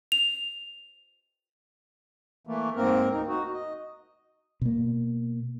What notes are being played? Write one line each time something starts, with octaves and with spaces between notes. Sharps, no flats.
F7
E3 A3 A#3
G#2 A#3 C4 A#4
D2 D#4
D#4 F#4
D#5
B2 A#3